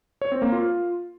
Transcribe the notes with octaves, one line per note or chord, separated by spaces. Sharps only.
C#5
C4
A#3
F4